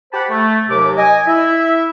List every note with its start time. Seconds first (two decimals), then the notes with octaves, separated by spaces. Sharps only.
0.13 G4 C5 F#5 A5 B5
0.29 A3
0.69 D#2 C3 F#3 D6
0.97 D#5 G#5
1.27 E4 E5